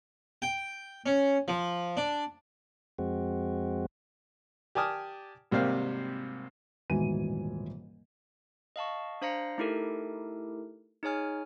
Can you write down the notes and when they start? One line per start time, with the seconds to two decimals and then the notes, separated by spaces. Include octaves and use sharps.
0.42 G5
1.06 C#4
1.48 F3
1.97 D4
2.99 F2 G#3 C4 F#4
4.75 G4 D5 G#5 A5 D#6 F6
5.51 G#1 C3 G3 A#3 C5 F5
6.90 D#1 G#2 B2 E3 G#5 D#7
8.76 D#5 F5 A5 C#6
9.22 D4 C5 F5 A#5 A#6 C#7
9.58 A3 D#4 E4 G4 A4 A#4
11.03 D#4 G#4 C#5 G#5 F6